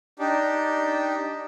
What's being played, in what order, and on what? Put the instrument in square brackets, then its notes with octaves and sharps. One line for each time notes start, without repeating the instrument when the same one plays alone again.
[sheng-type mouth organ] D4 D#4 G4